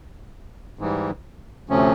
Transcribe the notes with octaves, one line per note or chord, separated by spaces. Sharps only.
G#2 E3 G3
D2 C3 F3 A3 C#4